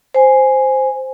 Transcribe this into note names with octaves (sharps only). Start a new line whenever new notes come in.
C5 G#5